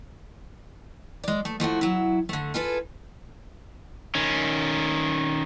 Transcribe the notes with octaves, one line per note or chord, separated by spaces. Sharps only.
G#3 D5
A3
F3 A3 E4 F#4
F#3 E4
D3 A3
F4 G#4 A4 B4
D#3 C#4